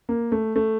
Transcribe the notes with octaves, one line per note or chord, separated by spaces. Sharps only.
A#3
A3
A3